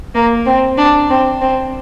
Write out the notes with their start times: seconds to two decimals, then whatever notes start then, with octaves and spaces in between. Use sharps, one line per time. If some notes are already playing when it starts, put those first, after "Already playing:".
0.15 A#3
0.46 C4
0.78 D4
1.10 C4
1.41 C4